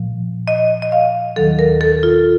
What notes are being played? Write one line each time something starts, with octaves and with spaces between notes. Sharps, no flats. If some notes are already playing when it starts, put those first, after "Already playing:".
Already playing: A#2 F3
D#5
D#5
F5
D#2 D#3 F#3 A4
A#4
A4
F4